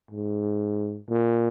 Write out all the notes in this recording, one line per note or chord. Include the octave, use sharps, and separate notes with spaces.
G#2
A#2